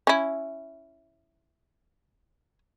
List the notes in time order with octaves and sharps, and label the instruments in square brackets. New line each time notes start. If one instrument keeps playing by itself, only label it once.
[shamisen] C#4 E4